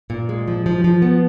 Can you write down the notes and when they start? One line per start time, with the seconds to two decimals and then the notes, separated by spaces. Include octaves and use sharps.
0.10 A#2
0.29 G#3
0.48 F3
0.66 F3
0.84 F3
1.02 B3